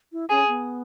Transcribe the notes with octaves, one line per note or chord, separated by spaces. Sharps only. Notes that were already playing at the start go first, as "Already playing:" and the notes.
E4
C#4 G#4
B3